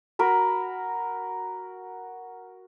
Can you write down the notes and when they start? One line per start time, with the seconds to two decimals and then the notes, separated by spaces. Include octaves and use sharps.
0.19 F#4 A#4 B5